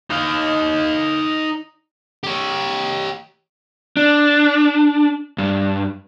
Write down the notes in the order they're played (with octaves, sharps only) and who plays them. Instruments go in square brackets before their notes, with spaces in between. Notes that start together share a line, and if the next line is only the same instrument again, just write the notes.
[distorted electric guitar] D#4 F5
G4 C#5
[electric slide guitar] D4
G2